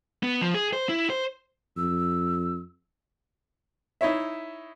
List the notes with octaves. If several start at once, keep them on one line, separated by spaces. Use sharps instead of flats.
B3
F3
G#4
C5
E4
C5
F2 E6
D#4 E4 C#5 E5